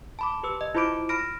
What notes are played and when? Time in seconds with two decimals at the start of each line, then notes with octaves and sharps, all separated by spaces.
0.19 A5 B5 D6
0.43 G4 B4 E6
0.61 D#5
0.75 E4 F4 C5 B5 D6 D7
1.09 B5 F6 A#6 D7